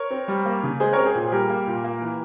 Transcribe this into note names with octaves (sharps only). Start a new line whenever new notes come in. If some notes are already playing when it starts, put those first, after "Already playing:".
Already playing: A#4 C#5
C4
G3
A#3
C#3
G#3 G#4 C5
C4 A#4 C#5
G#4 C5
A#2
G#4
G3 G4 A#4
A#3
A#2
A#3
E3